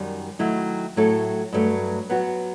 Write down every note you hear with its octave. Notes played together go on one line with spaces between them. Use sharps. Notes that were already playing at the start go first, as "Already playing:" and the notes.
Already playing: F#2 D#3 G3
D#3 F#3 A3 E4
A2 F#3 A3 E4 A4
G2 F#3 A3
F#3 B3 F#4